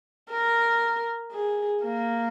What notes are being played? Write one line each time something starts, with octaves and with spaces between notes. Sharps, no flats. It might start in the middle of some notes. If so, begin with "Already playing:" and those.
A#4
G#4
A#3